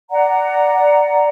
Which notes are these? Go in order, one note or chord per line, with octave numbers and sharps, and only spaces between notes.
D5 F#5 A#5